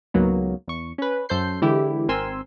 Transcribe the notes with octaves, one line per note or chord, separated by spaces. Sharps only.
C#2 G#2 F#3 A#3 B3
E2 C#6
C#4 B4
F#2 A4 C5 G6 C7
D3 E3 G#3 E4 G4
G#1 C4 A#4 G#5 C6 E6